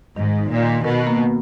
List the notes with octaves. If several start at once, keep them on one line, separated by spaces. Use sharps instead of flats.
G#2 D#3
D#4
A#2
D#3
B2 A#4
A#3